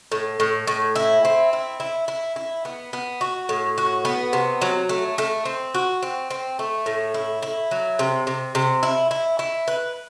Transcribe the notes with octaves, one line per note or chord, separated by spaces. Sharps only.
A2
A2
A2
E4
C4
E4
E4
E4
E4
B3
B3
F#4
A2
F#4
B3
C3
F#3
A3
A3
C4
F#4
C4
C4
A3
A2
E4
E4
F#3
C3
C3
C3
E4
E4
E4
B4